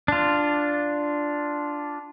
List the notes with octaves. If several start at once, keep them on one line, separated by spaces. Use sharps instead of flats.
D4 F4